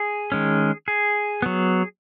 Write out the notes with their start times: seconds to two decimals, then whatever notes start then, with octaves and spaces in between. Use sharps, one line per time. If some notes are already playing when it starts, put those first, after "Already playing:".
Already playing: G#4
0.32 D#3 G#3 C#4
0.88 G#4
1.42 F#3 B3